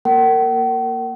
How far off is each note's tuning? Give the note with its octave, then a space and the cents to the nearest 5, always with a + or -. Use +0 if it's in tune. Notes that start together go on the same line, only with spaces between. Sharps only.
A#3 +0 A#4 -25 F#5 +45